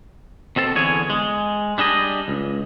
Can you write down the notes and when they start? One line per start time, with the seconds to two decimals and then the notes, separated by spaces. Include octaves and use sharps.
0.56 B2 C4 A4 A5
0.76 E2 D3 G#4 C#5 G#5
1.10 G#3
1.78 G3 D4 G#4 D#5
2.28 C#2